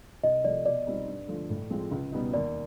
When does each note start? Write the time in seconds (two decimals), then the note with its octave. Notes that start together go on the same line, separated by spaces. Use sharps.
0.24 C2 D#5
0.45 C3 F3 A3 D5
0.66 B2 D5
0.87 G3 C4 D#4
1.08 G2
1.28 D3 F3 A3
1.50 A2
1.70 F3 G#3 C4
1.92 C#2
2.12 B2 G3 B3 D#4
2.33 D#2 D5